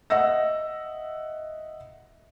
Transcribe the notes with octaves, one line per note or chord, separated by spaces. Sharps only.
D#5 E5 F#5 E6 A#6